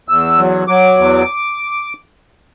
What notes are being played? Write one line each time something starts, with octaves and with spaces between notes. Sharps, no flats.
E2 E6
F#3
F#3 D6
E2